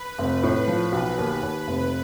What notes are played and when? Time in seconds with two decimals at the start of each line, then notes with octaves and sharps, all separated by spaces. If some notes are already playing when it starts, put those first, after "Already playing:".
Already playing: B4
0.18 F1
0.43 A2
0.68 F3
0.92 B1
1.18 D#2
1.43 D#2
1.67 F1